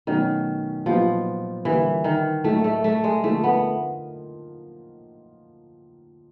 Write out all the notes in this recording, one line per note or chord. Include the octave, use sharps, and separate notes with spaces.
B2 D#3 F#3 A3 C#4
A#2 F3 F#3 B3 D#4 G4
D3 E3 G3 A#3
D#3
A2 F#3 A3 A#3 D#4
A3
A3
G#3
D3 F3 A3 A#3 D#4
B3